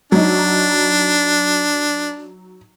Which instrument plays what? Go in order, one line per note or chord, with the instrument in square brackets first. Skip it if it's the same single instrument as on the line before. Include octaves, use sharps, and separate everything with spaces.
[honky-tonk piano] F#3 D#4 [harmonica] D4